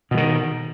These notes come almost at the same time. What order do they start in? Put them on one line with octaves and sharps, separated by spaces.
B2 E3 D#3